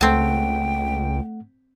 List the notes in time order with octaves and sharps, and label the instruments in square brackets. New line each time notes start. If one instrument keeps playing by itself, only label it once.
[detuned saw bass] C#2 [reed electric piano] A3 F#5 [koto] C4 A5 [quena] G5